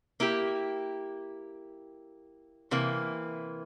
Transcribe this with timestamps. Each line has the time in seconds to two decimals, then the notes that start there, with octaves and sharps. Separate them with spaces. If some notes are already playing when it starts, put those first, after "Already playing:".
0.20 A#3 E4 G4
2.71 C3 E3 A#3